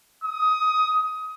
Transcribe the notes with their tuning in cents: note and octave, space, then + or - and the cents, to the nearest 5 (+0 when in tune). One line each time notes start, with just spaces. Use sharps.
D#6 +20